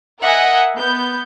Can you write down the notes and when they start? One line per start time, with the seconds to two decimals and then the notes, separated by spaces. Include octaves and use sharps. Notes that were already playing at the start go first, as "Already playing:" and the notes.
0.22 A#4 D#5 E5 F#5 G#5
0.77 B3 G6